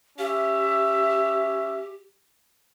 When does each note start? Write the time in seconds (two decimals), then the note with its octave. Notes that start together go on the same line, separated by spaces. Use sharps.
0.19 C#4 G4 E5